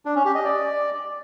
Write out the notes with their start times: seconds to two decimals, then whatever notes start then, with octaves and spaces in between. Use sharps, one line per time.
0.05 D4
0.15 C#4
0.25 G4
0.35 D#5
0.45 D5